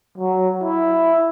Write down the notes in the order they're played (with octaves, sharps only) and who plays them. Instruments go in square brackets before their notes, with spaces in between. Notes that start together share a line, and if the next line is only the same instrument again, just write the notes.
[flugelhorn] F#3
E4